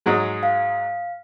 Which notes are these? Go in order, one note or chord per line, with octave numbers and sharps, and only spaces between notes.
G#2 F#3 G#3
F5